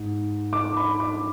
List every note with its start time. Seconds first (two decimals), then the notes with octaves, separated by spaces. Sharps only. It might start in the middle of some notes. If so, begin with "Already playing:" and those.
Already playing: G#2
0.53 D6
0.77 B5
1.00 D6